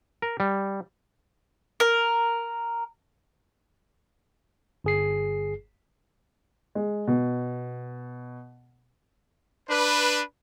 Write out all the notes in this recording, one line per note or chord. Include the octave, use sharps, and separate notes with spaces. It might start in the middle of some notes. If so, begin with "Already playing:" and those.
A#4
G3
A#4
G1 G#4 C7
G#3
B2
D4 B4